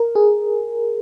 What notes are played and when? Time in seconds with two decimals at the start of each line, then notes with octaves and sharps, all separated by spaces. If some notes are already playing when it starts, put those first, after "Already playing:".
Already playing: A#4
0.15 G#4